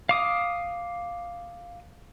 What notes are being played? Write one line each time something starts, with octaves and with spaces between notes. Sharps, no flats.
F5 D6 D#6